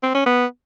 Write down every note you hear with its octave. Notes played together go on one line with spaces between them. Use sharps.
C4
C#4
B3